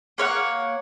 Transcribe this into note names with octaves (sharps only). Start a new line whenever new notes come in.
A#3 C#5 F5 F#5